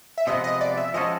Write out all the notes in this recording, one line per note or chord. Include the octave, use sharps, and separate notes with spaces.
E5
C3 F3 G#3 B3 D#5
D#5
D5
E5
F3 G#3 C#4 F#4 A4 D#5